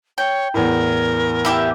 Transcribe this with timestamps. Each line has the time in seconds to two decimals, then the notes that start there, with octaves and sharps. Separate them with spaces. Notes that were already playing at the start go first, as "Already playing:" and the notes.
0.18 C#5 G5
0.54 E2 A2 A#4
1.45 E4 G4 E5